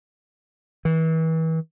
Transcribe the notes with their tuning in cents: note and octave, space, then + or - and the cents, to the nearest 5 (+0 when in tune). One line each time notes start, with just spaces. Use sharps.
E3 -35